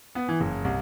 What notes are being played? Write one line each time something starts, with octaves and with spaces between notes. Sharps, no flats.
B3
E3
F#1
C2